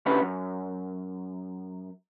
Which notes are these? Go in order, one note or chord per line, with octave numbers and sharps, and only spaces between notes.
D3 C#4 D4 E4 G4 B4
F#2